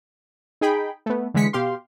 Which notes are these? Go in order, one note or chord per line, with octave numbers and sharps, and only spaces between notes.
D#4 G#4 G5 B5
A3 B3
D3 E3 G#3 B6 C#7
B2 G4 F5 C6